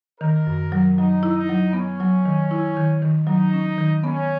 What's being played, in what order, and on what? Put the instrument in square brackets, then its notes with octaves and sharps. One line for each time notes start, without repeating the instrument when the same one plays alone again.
[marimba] D#3 [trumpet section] A#4
[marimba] F#2
F#3
[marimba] F#3 [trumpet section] D#4
[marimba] E4
[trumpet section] D#4
[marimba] F#3
[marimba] B3 [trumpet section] C#4
[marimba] F#3
D#3
E4
D#3
D#3
[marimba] F#3 [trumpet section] D#4
[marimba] C#4
D#3
[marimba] B3 [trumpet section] C#4